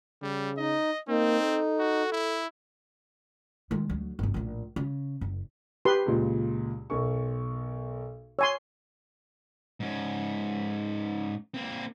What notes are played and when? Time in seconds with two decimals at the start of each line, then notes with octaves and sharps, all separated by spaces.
0.23 C#3 G3
0.58 D#4 D#5
1.09 A#3 C4 D#4
1.43 A4
1.79 F#4
2.12 E4
3.71 D#3 G#3
3.89 D2 F#3
4.19 G1 C#2
4.34 A#1 A2
4.76 C#3
5.21 F#1
5.85 G4 B4 C6
6.06 C#2 A#2
6.90 B1 A#4 C#6
8.39 C#5 G#5 C6 E6
9.80 G#2 C#4
11.54 A#3 C4